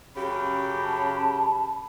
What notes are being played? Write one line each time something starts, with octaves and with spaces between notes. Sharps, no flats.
F#2 C#3 G4 B5
A5